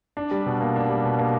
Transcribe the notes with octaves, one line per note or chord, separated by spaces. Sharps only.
D4
G3
B2
A#3
D4
G3
B2
A#3